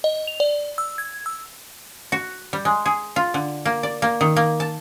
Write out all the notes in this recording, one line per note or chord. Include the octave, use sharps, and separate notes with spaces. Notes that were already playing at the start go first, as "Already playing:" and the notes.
D#5
F7
D5
E6
G#6
E6
F#4
G3
G#3
G#4
F4
D3
A#3
D5
A#3
D#3
A#3
A5